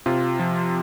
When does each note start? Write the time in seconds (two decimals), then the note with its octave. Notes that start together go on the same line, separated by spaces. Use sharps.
0.06 C3 F4
0.39 F3